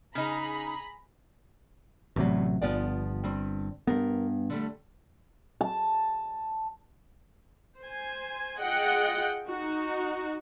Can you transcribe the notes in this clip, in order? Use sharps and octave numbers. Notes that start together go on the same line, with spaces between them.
C#3 D#4 G#4 A#5 B5
A1 E2 A2 C3 F#3
G1 F3 B3 D5
G2 C4
G2 B3 A#4
D3 G3 A3
A5
C5 G#5
F4 G#4 D#5 F#5 G5
D#4 F#4